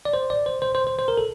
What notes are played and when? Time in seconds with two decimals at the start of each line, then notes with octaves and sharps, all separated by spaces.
0.05 D5
0.13 C5
0.30 D5
0.46 C5
0.62 C5
0.75 C5
0.87 C5
0.99 C5
1.08 A#4
1.17 A4